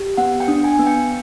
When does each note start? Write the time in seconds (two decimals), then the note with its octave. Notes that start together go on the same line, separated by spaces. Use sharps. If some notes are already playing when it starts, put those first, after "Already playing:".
Already playing: G4
0.17 B3 F#5
0.40 G5
0.48 D4
0.64 G#5
0.79 B3
0.86 G5